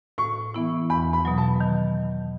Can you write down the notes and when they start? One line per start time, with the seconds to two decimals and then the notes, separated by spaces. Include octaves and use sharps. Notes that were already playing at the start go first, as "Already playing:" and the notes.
0.18 A2 C#6
0.54 E3 B3 E4
0.90 E2 B5
1.13 B5
1.25 B2 F#3
1.38 A5
1.61 D#3